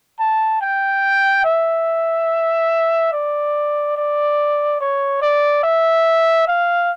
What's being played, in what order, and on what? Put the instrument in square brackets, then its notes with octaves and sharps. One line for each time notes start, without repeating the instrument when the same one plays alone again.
[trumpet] A5
G5
E5
D5
D5
C#5
D5
E5
F5